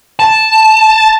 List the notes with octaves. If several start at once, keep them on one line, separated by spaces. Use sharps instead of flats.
A5